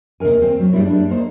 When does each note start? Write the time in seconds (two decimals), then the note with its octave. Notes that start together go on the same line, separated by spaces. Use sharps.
0.20 D#2 C3 D#3 A#4 G#5
0.42 C4
0.59 F#3
0.73 G2 A#2 G3 G#3 C4 E4
0.85 D4
1.09 A#3 D#4 C5